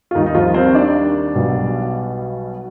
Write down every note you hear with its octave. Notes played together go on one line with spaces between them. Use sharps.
F4
D#2 D#3 G3 D#4
D#4
F3 F4
C4 C5
C5
D4 D5
B1 B2 G3